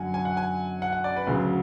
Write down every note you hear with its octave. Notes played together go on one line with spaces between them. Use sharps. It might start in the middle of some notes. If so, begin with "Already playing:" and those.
Already playing: F#2 D3 F#3 F#5 G#5
G#5
F#5
G#5
F#5
F#5
D5
B4
D2 C#3 F#3